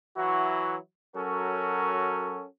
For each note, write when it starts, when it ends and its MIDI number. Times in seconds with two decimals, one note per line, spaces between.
0.17 0.77 52
0.17 0.77 54
0.17 0.77 64
0.17 0.77 66
1.16 2.44 54
1.16 2.44 61
1.16 2.44 66
1.16 2.44 69
1.16 2.44 70